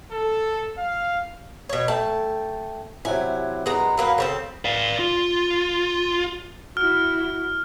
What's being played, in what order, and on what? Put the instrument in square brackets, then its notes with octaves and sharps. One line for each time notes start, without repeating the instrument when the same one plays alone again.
[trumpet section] A4
F5
[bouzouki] B2 C#5
[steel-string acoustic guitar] A3 G5 [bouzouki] A5
[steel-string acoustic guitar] C3 F#3 E4 [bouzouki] G#5
[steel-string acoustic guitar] F#2 B3 [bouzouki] G#3 A#5
[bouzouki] F#3 A#3 B4
C#3 C4 A4
[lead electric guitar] D5 F5
F4
[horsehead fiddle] E4 F#4 [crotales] F6